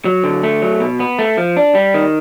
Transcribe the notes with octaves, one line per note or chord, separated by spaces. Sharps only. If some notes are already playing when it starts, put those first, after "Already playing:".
F#3
D3
A3
F#3
B2
B3
A3
F3
D4
G3
D#3